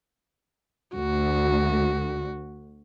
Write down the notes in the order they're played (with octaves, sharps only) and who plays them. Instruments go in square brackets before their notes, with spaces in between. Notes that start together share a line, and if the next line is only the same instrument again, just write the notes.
[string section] D2 [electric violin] F#4